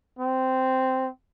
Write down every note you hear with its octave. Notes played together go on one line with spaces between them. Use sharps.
C4